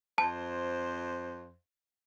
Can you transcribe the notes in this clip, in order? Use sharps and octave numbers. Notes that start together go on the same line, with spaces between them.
F2 C5 A5